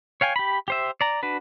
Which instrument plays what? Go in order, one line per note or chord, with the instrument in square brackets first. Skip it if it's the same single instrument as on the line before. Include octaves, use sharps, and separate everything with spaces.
[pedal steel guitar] C#5 F5 G5 G#5
G4 B5
G4 C5 E5
D5 A#5
D4 F#4 B4